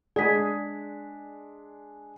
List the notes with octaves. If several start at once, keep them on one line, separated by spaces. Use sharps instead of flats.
G#3 D4 G#4 D5 B6